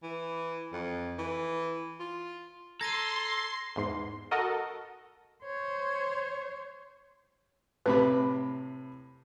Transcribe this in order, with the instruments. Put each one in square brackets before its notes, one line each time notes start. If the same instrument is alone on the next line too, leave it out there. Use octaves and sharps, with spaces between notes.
[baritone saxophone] E3
F2
E3
F4
[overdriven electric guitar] A4 [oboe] A#5 [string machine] C6 [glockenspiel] G#6 A#6 D#7
[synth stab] E2 G#2 C6
F#4 A4 A#4 D#5
[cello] C5 C#5
[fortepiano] A2 C3 B5 [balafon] B4